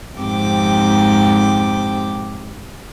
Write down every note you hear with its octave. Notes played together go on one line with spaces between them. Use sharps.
F2 G#2 C3 G5 D6